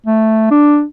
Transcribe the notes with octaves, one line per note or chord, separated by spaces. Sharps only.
A3
D4